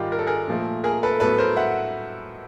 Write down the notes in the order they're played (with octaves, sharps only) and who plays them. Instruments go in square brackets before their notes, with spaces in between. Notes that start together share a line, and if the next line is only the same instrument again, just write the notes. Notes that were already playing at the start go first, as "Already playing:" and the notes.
Already playing: [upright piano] G#2 D#3 G3 F4 G4
A#4
A4
G#4 A#4
A#2 F3 A3
G#4 A#4
A4 B4
A2 F#3 B3 A4 B4
A#4 C5
E5 F#5